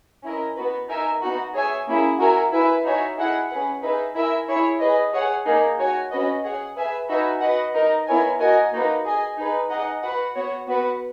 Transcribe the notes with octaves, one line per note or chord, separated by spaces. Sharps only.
C#4 E4 A#4 D#5
B3 F#4 B4
D#4 A#4 E5 G#5
B3 D#4 F#4
G#4 C#5 E5 G#5
A#3 C#4 E4 G#4
F#4 A#4 E5 G#5
E4 B4 E5 G#5
D#4 F#4 C#5 E5 G#5
E4 G#4 D#5 F#5
C#4 G#4 B4 F#5
D#4 G#4 B4 E5
E4 A#4 E5 G#5
E4 G#4 C#5
G#4 B4 D#5
G#4 C#5 F#5
A#3 D#4 G#4
F#4 C#5 G#5
C#4 F#4 B4 D#5
G#4 C#5 F#5
G#4 B4 E5 G#5
D#4 F#4 B4 E5 G#5
F#4 B4 D#5 F#5
D#4 A#4 D#5
B3 E4 A#4 C#5 G#5
F#4 A#4 D#5 G#5
A#3 D#4 F#4 B4
G#4 D#5 G#5
D#4 G#4 B4
D#4 G#4 D#5 F#5
F#4 B4 F#5
B3 F#4 C#5 F#5
B3 F#4 B4 F#5